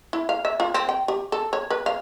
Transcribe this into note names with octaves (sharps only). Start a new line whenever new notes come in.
E4
F5
E5
F4
C4
G5
G4
A4
C#5
B4
F5